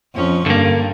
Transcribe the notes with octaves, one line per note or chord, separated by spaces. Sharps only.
F2 C#4
G2 D3 A#3